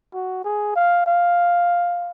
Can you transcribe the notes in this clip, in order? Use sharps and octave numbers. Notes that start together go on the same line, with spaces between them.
F#4
G#4
F5
F5